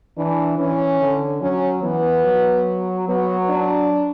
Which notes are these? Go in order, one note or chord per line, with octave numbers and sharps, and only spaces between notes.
E3 D4
E3 C#4
D3
F#3 C#4
E3 B3
F#3
F#3 B3
D4